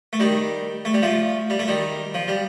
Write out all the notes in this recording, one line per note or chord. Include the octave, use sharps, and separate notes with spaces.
A3
D#3 G3
A3
G3
F3 A3
G3
A3
D#3 G3
F3
G3